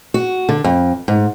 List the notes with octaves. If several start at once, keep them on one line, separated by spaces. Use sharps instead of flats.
F#4
D3
F2
G#2